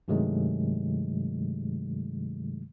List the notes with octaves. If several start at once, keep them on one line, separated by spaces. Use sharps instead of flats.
G2 C3 D#3 F#3 G#3 A3